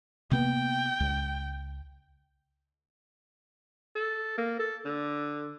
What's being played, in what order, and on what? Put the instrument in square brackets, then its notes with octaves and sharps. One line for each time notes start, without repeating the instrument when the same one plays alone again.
[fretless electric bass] C3 A#3 B3 [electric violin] G5
[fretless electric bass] C#2
[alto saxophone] A4
A#3
A4
D3